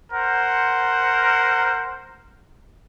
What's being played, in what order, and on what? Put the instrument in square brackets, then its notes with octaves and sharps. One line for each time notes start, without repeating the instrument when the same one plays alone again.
[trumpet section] A#4 C5 F#5